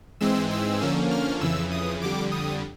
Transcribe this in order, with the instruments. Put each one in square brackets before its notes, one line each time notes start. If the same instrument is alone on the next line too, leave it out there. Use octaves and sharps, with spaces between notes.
[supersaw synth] G#2 E3 G#3 C4 E6
E6
D3 F3 A#3 C#4
F6
F2 C#3 E3 E6
D#6
F2 D3 G3 D6
D#6